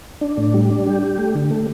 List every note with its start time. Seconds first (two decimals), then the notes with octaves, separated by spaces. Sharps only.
0.21 D4
0.37 A2
0.54 G3
0.71 D4
0.86 G4
1.03 G4
1.18 A3
1.35 D3
1.51 A3